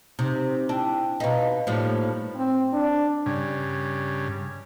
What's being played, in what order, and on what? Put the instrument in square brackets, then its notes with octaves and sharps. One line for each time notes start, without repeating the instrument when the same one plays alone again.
[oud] C3 [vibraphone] D#4
[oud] D4 [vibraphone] E4 G5
[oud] B2 D#4 [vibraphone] B4 F5
[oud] A2 F3 G3 [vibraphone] A#3 D#4 C#5
[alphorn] C4
D4
[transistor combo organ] G2 C#3